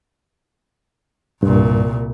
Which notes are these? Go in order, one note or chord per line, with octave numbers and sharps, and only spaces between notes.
C2 G2 A#2